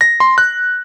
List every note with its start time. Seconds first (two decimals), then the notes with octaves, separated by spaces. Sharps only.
0.01 A#6
0.20 C6
0.38 F#6